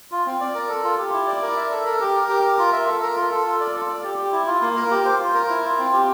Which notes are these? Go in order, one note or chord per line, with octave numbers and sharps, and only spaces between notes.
F4
C4
D5
A#4
A4
F4
G4
E4
D5
A#4
E5
A4
A#4
G4
A#4
G4
A#4
F4
E5
A4
A#4
F4
A4
F4
D5
A4
D5
G4
G4
E4
F4
A#3
A#4
G4
C5
F4
A#4
E4
F4
C4
G4